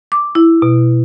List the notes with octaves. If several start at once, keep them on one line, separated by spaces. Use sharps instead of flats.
D6
E4
B2